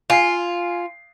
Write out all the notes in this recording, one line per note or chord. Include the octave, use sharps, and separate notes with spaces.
F4 G#5 C7